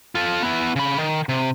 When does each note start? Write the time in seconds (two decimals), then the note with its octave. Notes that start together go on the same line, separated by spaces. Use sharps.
0.15 F4 A4
0.43 B3 E4
0.76 C#3 B5
0.98 D#3
1.29 C3